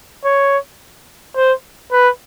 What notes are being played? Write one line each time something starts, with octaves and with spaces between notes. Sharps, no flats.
C#5
C5
B4